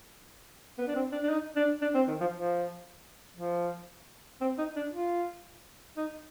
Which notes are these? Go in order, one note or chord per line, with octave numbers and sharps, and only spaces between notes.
B3
D4
C4
D4
D4
D#4
D4
D4
C4
D#3
F3
F3
F3
C4
D#4
D4
F4
D#4